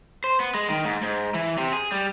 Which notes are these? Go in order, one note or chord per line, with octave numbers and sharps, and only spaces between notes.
C5
B3
G#3
D#3
G#2
G#2
E3
C3
G#4
G3